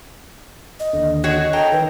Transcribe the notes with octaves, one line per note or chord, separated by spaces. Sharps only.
D#5
D#2 D3
F#4 G#4 C#5 D#5
A4 D#5 G5 A#5
D#3 B4